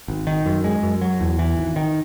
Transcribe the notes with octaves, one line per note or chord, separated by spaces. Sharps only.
G#1
D#3
F#2
G#3
F#2
F#3
E2
E3
G#1
D#3